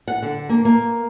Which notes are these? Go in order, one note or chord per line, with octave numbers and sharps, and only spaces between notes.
F#5
D3
A#3
A#3